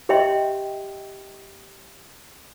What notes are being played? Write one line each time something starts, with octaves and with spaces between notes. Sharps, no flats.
G4 C#5 D#5 E5 G5 C6